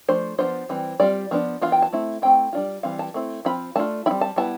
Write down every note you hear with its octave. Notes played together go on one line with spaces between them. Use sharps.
F3 A3 D4 C5
F3 B3 D4 F4 C5
E3 G3 C4
G3 C4 F4 D5
F3 B3 D4
E3 B3 D4 F4 F5
G5
A5
A3 C4 E4
A3 C4 E4 G5
G3 D4 F4
E3 G3 C4 F5
A5
A3 C4 E4
F3 C4 F4 B5
A3 D4 F4 A5
G3 C4 E4 B5
A5
G3 B3 E4 A5